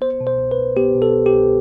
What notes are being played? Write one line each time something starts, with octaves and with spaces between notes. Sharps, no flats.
B3 C5
B2
C5
C2
B4
C2
B3 G4
B2
A4
C2
G4
C2